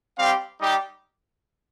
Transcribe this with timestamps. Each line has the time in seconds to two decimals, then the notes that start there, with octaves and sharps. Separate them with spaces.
0.18 G3 C4 G4 F5
0.60 G3 D#4 G4